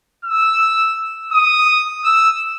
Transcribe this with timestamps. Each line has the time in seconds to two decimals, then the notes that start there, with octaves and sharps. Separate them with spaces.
0.25 E6
1.32 D#6
2.05 E6